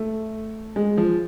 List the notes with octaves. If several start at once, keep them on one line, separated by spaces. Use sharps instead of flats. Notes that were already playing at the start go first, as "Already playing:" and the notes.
Already playing: A3
G#3
F3